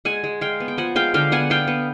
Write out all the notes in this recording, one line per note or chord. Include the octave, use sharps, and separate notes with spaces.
G#3 F#5 G#5
G#3
G#3 F5 G5
B3
G5
F3 F#5 G#5
G#3 F5 G5
D3 F5 G5
B3 F#5 G#5
B3 F5 G5
B3